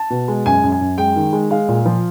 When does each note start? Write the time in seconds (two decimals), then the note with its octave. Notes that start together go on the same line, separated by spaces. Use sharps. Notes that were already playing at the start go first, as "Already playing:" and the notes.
Already playing: A5
0.10 B2
0.28 G#3
0.46 F#2 G#5
0.64 F#2
0.72 G#5
0.81 F#2
0.98 G#3 G5
1.16 D#3
1.33 G#3
1.51 G#3 F5
1.68 A#2
1.86 F3